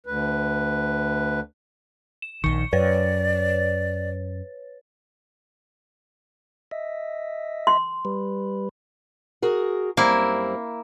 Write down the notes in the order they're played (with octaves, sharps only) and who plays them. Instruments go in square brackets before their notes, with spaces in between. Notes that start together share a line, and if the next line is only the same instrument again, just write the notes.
[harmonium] D2 B4
[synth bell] E7
[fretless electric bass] A#1 D#3 [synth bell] C#6 C#7
[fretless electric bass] F#2 [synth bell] B4 C#5 A6 [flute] D5
[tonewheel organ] D#5 E5
[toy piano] C6
[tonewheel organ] G3 B4
[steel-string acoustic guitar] F#4 G#4 A#4
[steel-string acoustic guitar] F#2 G3 C4 [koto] A#3 E4